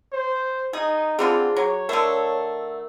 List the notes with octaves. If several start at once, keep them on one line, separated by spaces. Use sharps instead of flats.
C5
D#4 G#4
D3 B3 C4 F4 G#4 F#5
F#3 C#5
D3 A3 A#4 E6